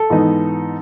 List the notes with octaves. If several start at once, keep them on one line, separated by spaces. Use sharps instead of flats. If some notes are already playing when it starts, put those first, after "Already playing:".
Already playing: A4
G#2 E3 B3 D#4